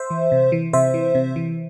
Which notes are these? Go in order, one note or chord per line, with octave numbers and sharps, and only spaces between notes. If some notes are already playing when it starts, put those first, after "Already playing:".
Already playing: C5 E5
E3
C3
E3
C3 C5 E5
E3
C3
E3